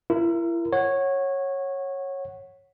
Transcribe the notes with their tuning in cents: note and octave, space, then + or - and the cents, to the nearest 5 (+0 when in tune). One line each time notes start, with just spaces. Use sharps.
E4 +35 A#4 +0
C#5 -15 F#5 +0